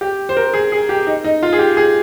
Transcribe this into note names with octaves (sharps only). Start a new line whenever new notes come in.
G4
C5
A#4
G#4
G#4
G4
D#4
D#4
F4
G#4
G4
G#4